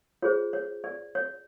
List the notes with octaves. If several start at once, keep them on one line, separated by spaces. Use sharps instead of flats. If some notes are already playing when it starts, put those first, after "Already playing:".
F4 G#4 C5 C#5
C#5
D5
C#5